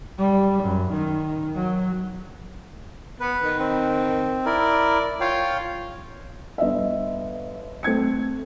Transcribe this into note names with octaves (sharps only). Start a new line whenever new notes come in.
G3
F#2
D#3
F#3
B3 B4
D#3
C4
E4 A#4 D5
F4 C#5 F5 G5
G1 D#5 E5
A3 C4 G#6 C#7